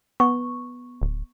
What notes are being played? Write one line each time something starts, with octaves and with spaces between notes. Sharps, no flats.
B3 C#6
D1